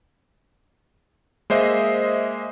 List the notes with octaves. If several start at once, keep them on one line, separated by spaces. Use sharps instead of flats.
G#3 A#3 C5 D#5 E5